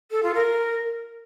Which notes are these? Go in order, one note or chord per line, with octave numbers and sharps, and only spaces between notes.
A4
F4
A#4